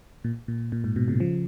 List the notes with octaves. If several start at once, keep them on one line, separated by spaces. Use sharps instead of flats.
A#2
A#2
A#2
G#2
G#2 B2
A#2 C#3
C#3 F3